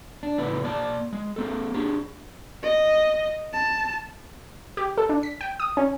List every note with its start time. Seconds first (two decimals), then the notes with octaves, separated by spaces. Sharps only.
0.23 D4
0.38 F2 A2 C#3 E4 B4
0.64 A#3 D5 A5
1.13 G#3
1.36 A#3 C4 A4
1.74 D4 G4 G#4
2.63 D#5
3.53 A5
4.77 G4
4.98 A4
5.09 D4
5.23 B6
5.41 G5
5.60 D#6
5.77 C#4